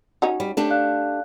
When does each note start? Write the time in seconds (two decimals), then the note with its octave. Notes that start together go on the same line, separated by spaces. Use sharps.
0.22 C#4 D#4 F#4
0.40 G3
0.57 A3 D4 G4
0.70 D5 F5 F#6